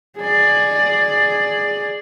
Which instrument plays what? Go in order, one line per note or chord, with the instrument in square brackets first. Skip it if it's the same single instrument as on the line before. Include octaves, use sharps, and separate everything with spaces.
[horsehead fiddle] G#4 D5